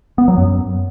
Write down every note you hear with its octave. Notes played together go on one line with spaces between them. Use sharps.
B3
F#3
F#2